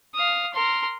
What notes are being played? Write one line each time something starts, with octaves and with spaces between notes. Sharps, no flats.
F5 D#6
A#4 C6